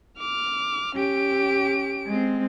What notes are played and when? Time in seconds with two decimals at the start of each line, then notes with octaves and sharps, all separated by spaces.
0.18 D6 F6
0.96 C#4 G4 D7
2.06 G#3 C4